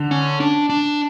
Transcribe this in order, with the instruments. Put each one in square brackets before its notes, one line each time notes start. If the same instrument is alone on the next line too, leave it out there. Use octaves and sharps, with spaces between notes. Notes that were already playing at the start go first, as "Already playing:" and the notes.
Already playing: [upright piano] D3
[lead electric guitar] C#4
D4
D4